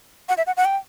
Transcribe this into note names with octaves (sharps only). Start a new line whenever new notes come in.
F#5
E5
F#5
F#5
G5